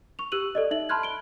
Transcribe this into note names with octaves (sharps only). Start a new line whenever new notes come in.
C#6 F7
G4 E6 F#6 D#7 F#7
A4 D5 D#5
D#4 E5 F#7
A5 B5 C6 F6 F#6 G#6
D7 G7